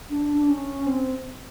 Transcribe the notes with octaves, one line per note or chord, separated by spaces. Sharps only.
D4
D4
C#4
C4